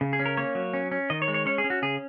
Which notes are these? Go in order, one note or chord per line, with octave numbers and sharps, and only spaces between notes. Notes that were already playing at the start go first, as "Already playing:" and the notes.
C#3
G#4
C#4
A#4
A#3 C#5
F#3
C#4
C#4
D#3 D#5
C#5
G#3
C#5
C#4 C#5
G#4
C#4
F#4
C#3 G#4